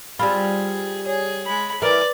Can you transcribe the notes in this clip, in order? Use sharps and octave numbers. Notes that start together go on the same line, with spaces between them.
G3 C4 F4 G#4 B5
G#4 C#5
G#3 B5
E3 A#4 B4 D5 D6